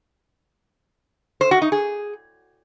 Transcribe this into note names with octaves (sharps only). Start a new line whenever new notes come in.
C5
F#4
D#4
G#4